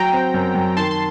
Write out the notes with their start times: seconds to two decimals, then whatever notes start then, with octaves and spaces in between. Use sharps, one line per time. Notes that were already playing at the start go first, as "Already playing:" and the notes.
Already playing: F#3 G5 A#5
0.13 C4
0.34 F#2
0.55 F#2
0.77 D#3 A5 C6
0.91 C6